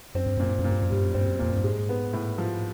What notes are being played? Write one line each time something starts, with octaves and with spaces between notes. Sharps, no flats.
F#2 C4
G2
F#2 A#2
G2
F#2
A#2
G2
F#2
G2 G3
F#2
G2 C4
F#2
F2 A#2
F#2
G2
G#2 G#3
B3
A2
F3